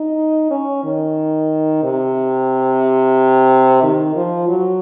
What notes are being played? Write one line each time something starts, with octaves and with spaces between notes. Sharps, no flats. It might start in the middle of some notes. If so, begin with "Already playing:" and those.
Already playing: D#4
C#4
D#3
C3
D#3
F3
F#3